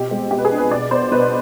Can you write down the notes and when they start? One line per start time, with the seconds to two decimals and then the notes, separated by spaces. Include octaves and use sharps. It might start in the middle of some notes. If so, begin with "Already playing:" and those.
Already playing: B2 C4 G4
0.11 G#3
0.31 B2 G4
0.38 B4
0.45 G#4
0.52 D4
0.58 B4
0.71 B2 D5
0.91 B3 C5
1.12 B2 B4